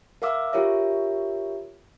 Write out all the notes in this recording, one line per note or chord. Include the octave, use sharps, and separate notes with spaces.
A#4 E5 F5 D6 E6
F4 G4 A#4 C#5 E5